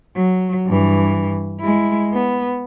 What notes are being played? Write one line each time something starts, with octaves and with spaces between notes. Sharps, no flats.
F#3
G2 E3
G#3 E4
B3